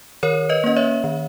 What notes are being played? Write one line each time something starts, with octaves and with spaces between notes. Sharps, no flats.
D#3 A#4 C#5
B4 D#5
A#3 C#4 D#5
C#5 E5
D#3